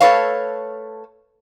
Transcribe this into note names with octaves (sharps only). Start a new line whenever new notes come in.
A3 A4 B4 C#5 F5